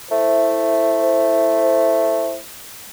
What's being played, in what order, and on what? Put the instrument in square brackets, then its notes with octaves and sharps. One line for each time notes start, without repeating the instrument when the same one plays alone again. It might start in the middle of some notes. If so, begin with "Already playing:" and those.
[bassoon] A3 [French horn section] E4 C5